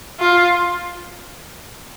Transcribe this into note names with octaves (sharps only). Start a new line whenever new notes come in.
F4